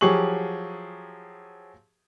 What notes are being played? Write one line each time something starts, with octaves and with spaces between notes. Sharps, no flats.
F3 F#3 G4 G#4 C#6 F#7